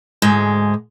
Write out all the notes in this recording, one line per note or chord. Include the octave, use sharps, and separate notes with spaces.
D2 G#2 G#3